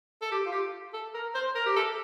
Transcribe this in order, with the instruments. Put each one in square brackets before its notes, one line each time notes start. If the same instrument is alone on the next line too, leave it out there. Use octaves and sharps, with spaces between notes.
[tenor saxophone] A4
G4
F4
G4
A4
A#4
C5
A#4
G4
A4